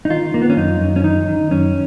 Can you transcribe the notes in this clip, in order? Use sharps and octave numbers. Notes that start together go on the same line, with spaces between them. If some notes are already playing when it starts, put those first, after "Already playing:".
D#4
D#3 F4
D#3 A#3
B3
C#4
F#2 D#4
F#2
C#4
D#3 D#4
D#3
F#2 C#4